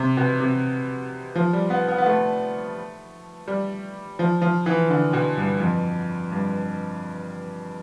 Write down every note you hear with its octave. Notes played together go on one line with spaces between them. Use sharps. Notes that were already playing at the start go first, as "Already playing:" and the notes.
Already playing: C3
B2
C3
F3
G3
B3
B3
B3
A3
G3
F3
F3
E3
D3
B2
G2
F2
G2